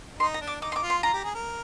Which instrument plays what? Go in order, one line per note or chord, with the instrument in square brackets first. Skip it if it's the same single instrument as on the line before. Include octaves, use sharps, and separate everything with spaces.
[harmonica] D#4 [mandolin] C6
[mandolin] A#5
[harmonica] D4
[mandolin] D6
[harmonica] D#4 [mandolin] D6
[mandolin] C6
D6
[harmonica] F4
[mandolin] C6
[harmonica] F4 [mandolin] A#5
[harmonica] G4
G#4
A#4